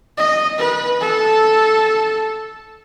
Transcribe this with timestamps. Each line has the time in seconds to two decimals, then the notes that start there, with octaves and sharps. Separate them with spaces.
0.17 D#5
0.59 B4
1.01 A4